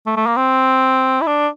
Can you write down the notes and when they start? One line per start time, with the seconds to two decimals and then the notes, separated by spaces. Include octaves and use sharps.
0.06 A3
0.17 A3
0.26 A#3
0.36 C4
1.21 E4
1.27 D4